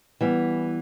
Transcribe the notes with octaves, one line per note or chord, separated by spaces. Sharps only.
E3 G3 B3